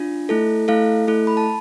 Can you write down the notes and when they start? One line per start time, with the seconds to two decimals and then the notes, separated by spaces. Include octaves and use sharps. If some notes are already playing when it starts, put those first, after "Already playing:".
Already playing: D4 F4
0.29 A3 E4 A4
0.68 A3 E4 A4 F5
1.07 A3 E4 A4
1.27 B5
1.37 A5